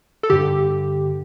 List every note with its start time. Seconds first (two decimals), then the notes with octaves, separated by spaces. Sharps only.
0.23 A4
0.30 G2 D3 G4